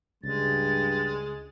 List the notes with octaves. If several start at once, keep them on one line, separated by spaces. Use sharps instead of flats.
C#2 G2 G#3 A6